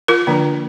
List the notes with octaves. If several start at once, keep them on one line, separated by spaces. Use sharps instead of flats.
F4 A#4
D3 F3 A#3 D4